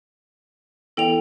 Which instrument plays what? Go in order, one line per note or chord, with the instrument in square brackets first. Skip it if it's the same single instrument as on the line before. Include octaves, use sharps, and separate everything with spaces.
[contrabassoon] E2 [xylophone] A4 G5 F7